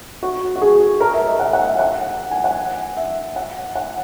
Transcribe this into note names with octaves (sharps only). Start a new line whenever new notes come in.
F#4
F#4
G#4
A#4
E5
D#5
F#5
F#5
E5
F#5
G#5
F#5
E5
F#5
F#5